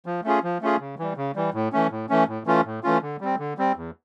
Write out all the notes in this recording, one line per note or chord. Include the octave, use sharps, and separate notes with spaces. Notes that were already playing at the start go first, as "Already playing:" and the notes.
F3
A3 C#4 F4 G#4
F3
A3 C#4 F4 G#4
C#3
E3 G3
C#3
E3 G3
A2
E3 A3 C#4
A2
E3 A3 C#4
A2
E3 A3 C#4 F4
A2
E3 A3 C#4 F4
D3
G3 C4
D3
G3 C4
E2